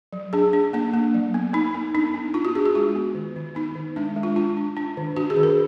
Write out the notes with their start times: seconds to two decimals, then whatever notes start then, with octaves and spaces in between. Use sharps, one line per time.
0.13 F#3
0.33 D4 G#4
0.53 D4
0.73 A#3 D4
0.93 A#3
1.14 F#3
1.34 B3
1.54 B3 D#4
1.74 B3
1.95 D4 D#4
2.14 B3
2.34 D4 F4
2.45 F#4
2.55 D4 G#4
2.66 F#4
2.75 G#3 F4
2.95 B3
3.15 D#3
3.36 D#3
3.55 B3 D#4
3.75 D#3
3.96 G#3 D4
4.16 G#3
4.23 F4
4.36 D4 F4
4.57 D4
4.77 D4
4.97 D#3
5.16 D4 F#4
5.30 G#4
5.36 D#3
5.43 A#4